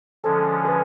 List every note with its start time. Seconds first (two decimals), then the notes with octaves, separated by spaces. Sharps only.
0.24 D3 F3 G#3 C#4 A4
0.65 B4